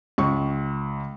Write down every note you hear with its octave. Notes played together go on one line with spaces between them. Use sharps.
C#2 C#6